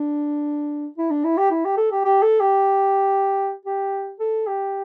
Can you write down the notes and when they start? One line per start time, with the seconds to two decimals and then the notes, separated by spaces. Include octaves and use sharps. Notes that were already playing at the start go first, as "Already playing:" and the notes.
Already playing: D4
0.98 E4
1.10 D4
1.24 E4
1.38 G4
1.51 E4
1.65 G4
1.77 A4
1.92 G4
2.05 G4
2.22 A4
2.40 G4
3.65 G4
4.20 A4
4.47 G4